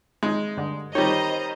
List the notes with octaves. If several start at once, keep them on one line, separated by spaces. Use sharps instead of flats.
G#3 D#4
G2 D3
D#3 G3 C5 C#5 D#5 A#5